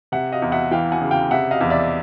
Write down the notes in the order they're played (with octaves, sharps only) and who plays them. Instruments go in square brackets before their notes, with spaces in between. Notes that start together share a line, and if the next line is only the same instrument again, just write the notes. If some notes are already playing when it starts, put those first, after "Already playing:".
[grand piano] C3 E5 F#5
D#5 F5
E2
E5 F#5
E3 F5 G5
F#5 G#5
C#3
F5 G5
C3 E5 F#5
D#5 F5
E2
D5 E5